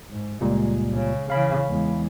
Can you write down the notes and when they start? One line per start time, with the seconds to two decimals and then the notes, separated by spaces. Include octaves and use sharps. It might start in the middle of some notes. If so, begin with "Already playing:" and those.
0.10 G#2
0.41 C#2 A#2 G3 G#3
0.94 C#3
1.30 C#3 E3 F5 B5
1.67 E2 G#3